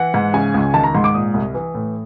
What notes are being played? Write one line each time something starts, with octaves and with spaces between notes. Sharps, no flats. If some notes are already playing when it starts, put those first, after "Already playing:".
Already playing: E3 F#5
G#2
C#3 G#5
C#2
D#3 A5
A#5
G#2 C6
D6
A#2 D#6
C2
E3
A2